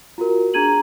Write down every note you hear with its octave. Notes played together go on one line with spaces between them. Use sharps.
F4 F#4 A#4
D4 G#4 A#5 G#6 D#7 F#7